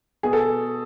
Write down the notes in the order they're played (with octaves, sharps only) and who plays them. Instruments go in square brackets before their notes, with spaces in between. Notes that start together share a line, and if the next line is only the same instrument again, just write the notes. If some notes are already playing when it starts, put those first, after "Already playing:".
[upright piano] B2 [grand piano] G#4
[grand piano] A4